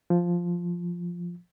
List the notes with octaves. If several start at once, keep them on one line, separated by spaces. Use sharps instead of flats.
F3